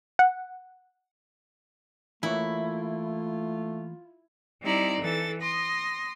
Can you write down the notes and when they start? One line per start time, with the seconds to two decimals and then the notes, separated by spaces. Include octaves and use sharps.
0.19 F#5
2.23 E3 A3 A#3 E4 F4 C#5
4.62 G3 C4 D#4 E4 D5 A#5
5.01 E3 A4 A6
5.42 C6 D#6 A#6